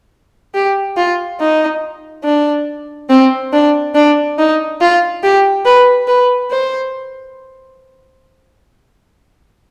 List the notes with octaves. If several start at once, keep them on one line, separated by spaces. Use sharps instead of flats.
G4
F4
D#4
D4
C4
D4
D4
D#4
F4
G4
B4
B4
C5